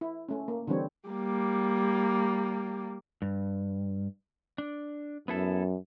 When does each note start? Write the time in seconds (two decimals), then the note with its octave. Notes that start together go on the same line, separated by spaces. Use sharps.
0.01 E4
0.29 A3 C#4
0.48 A#3
0.67 D3 E3 G3 C4 C#5
1.09 G3 A#3
3.22 G2
4.58 D4
5.28 F#2 B3 E4 A4